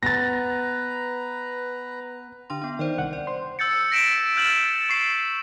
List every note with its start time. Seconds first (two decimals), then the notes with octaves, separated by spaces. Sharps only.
0.03 B3 B4 A#5 A6 A#6
2.50 D3 D4 C6
2.62 B3 D4
2.79 D#3 C5 D5 G5
2.98 C2 F#5
3.13 D5
3.27 C5 C6
3.59 E6 G6 A6 C#7
3.92 A#6 B6 D7 E7
4.37 F6 G6 A6 E7 F#7
4.89 C#6 C7